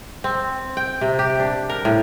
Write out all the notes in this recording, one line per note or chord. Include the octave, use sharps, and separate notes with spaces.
C4
G5
C3
G4
D4
A#4
A2